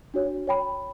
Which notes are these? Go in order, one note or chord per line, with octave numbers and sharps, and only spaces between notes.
D4 F#4 C#5
C#5 G5 B5